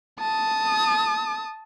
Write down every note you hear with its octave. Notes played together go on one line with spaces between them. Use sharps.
A5 D#6